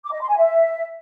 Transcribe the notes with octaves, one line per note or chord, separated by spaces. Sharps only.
D6
D#5
C6
G#5
E5